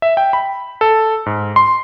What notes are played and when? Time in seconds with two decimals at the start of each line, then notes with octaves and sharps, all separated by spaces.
0.02 E5
0.17 G5
0.33 B5
0.81 A4
1.26 G#2
1.56 C6